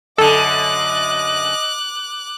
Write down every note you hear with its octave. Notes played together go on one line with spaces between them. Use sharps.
F#2 D3 A4 D#5 D6 F#6